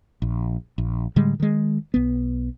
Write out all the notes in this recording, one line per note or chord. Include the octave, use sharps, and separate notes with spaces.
A#1
A#1
A2 D3 G3 G#3
D#3 G#3
B1 B3